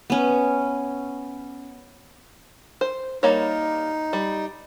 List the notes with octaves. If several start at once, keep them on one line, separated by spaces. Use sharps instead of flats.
B3 C#4
C5
G3 A#3 D#4 C#5
G3